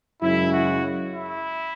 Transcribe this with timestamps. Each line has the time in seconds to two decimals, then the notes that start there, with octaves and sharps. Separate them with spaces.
0.22 F#2 C#3 G#3 C#4 E4
0.53 F#4
1.14 E4